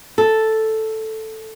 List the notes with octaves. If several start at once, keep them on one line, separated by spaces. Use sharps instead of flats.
A4